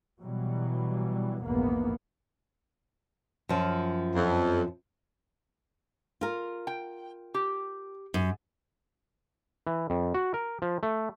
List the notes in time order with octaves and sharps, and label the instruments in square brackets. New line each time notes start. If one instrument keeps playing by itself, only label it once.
[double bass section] B2 E3 F#3 G3
A#1 E2 G#2 A#3 B3
[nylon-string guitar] F#2 F3
[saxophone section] F2
[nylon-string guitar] F4 A#4
[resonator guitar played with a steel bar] G5
G4
[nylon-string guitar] F#2
[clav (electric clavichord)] E3
F2
F#4
A#4
F3
A3